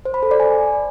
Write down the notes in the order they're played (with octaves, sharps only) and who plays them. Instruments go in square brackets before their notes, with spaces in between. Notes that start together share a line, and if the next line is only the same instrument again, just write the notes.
[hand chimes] C5
B5
A4
D5
G#5